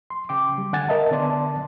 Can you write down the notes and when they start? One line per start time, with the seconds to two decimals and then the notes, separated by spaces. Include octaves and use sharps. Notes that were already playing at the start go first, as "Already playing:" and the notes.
0.10 C6
0.29 C#3 G5 D6
0.58 G3
0.73 D3 F#5 G#5 A6
0.89 A#4 D#5 E5 A5
1.11 D3 B3 D5 A5 C6